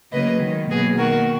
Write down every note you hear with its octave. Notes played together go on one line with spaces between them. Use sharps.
C#3 F#3 A#3 B4 D#5
D#3 G#3
B2 F#3 A#3 G#4 B4
D#3 A#3 F#4 A#4